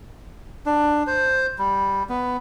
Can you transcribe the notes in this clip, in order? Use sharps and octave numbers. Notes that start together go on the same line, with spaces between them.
D4
C5
G3
B3